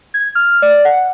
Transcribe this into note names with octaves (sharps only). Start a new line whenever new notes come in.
G#6
F6
D5
F#5